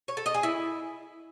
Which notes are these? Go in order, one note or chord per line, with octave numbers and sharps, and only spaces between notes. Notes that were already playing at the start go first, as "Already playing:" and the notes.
C#5
A4
D#5
G#4
E4